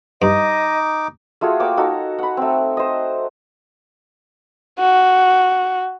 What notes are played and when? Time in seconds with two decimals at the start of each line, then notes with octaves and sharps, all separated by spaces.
0.22 G2 D#4 D#5 D6
1.41 A3 F4 F#4 G#4
1.60 A#3 C#5 G5 D6
1.77 D#4 F#4 A4 A#5
2.18 F#5 B5
2.37 A3 C4
2.77 C5 D#5
4.79 F#4